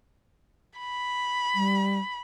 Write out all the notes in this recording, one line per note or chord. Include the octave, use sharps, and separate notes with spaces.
B5
G3